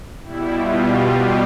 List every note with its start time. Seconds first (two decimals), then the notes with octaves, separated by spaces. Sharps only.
0.23 B2 G3 E4
0.52 F4
0.81 F4
1.10 G4